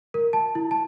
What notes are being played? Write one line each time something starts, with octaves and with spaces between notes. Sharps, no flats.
A#4
A5
E4
A5